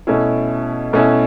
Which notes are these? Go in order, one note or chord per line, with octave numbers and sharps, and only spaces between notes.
B2 A3 C#4 E4
B2 A3 C#4 E4